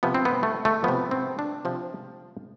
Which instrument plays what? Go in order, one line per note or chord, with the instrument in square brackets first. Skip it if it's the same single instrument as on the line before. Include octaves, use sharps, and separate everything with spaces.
[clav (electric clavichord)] C3 F3 B3
C4
B3
A3
A3
C3 F3 B3
C4
D4
C3 F3